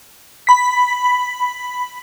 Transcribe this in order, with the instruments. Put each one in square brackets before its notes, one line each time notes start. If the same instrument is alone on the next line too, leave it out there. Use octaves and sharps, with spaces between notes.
[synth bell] B5 B6